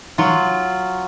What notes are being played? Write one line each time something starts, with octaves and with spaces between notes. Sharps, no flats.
F#3 F4